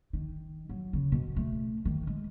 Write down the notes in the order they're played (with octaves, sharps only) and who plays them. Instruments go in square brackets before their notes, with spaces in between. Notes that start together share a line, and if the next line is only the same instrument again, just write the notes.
[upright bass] D#3
F#3
C#3
B2
A3
D#3
G#3